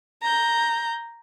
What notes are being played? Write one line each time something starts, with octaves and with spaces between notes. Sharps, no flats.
A#5 G6